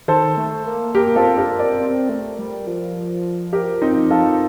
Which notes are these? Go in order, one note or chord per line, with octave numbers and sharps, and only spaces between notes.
D#3 A4 C5
A3
A#3
A#3 G4 A#4
C4 F4 A4
D4 G4 A#4
C4 A#4 D5
C4
A3
G3
F3
G4 A#4
C4 D#4
F4 A4